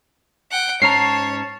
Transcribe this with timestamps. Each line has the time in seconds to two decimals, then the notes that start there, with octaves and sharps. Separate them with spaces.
0.51 F#5 G5
0.82 G#2 C#4 C#5 A5 A#5 C7